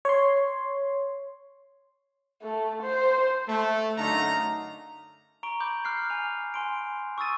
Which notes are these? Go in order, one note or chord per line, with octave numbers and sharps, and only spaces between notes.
C#5 C6
A3
C5
A3
F#2 D3 A3 D#4 F5 A#5
A#5 C#6 D7 G7
B5 D6 G6
D6 F6 F#6 C7
G#5 F7
G#5 C6 D7
C#6 D#6 E6 A6 D#7